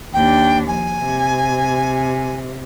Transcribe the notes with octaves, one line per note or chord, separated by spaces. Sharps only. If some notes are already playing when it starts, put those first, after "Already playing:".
D#2 D4 G5
F3 G#5
C3